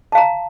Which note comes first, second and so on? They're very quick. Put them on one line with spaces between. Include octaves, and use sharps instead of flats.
A5 F5 A#5